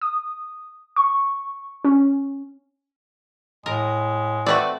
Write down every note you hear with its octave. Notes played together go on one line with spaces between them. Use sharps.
D#6
C#6
C#4
A2 G#3 A#4
A3 C4 F#4 B4 D5